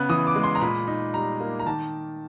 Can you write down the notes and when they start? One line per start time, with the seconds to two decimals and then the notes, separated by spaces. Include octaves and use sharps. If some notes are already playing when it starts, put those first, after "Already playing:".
Already playing: C#3 B3 F#6
0.09 E3 D#6
0.27 D6
0.35 G#3
0.43 C6
0.55 A#5
0.61 A#2 B5
0.87 D#4
1.14 G3 A#5
1.41 A#3
1.60 A#5
1.66 D#3 A5